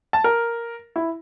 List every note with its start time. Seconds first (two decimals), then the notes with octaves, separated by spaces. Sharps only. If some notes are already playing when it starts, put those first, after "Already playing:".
0.13 A5
0.24 A#4
0.96 E4